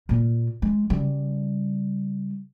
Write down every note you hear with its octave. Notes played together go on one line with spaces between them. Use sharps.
A#2 A#3
G#3
C#3 G3